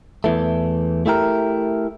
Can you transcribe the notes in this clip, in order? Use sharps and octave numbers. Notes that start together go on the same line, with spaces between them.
E2 E3 A3
A3 E4 G4 A#4